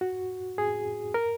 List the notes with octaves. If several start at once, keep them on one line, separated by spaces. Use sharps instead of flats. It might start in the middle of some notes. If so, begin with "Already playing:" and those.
F#4
G#4
A#4